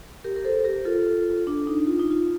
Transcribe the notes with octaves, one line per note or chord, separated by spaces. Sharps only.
G4 A#4
A#4
A4 C5
G4 A#4
F4 A4
D4
D#4
F4
D#4
F4